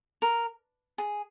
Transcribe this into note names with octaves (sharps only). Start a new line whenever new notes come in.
A#4
G#4